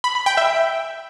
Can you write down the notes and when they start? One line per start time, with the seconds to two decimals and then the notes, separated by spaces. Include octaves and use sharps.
0.04 B5
0.15 B5
0.26 G5
0.37 E5